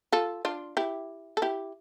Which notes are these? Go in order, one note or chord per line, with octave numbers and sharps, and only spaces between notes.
F4 A4
D4 F4
E4 G4
A4
E4 G4